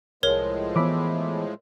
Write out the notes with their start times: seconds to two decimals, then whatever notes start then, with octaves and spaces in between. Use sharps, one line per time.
0.23 C2 A2 F3 G#3 A#4 C#5
0.76 E3 B3 E5 B5 D6